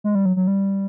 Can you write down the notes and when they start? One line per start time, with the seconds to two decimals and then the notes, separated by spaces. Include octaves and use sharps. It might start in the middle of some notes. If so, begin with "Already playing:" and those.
0.04 G#3
0.15 G3
0.26 F#3
0.36 F#3
0.47 G3